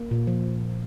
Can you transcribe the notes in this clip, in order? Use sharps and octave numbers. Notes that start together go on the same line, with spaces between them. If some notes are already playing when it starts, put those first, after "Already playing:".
Already playing: A#3
A#2
F3